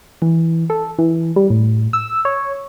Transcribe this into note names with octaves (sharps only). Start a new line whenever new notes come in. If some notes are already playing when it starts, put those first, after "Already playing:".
E3
A4
E3
G3
A2
E6
C#5